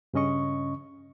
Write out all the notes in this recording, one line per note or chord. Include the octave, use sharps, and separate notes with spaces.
G2 C#3 C#4 D#5 C#6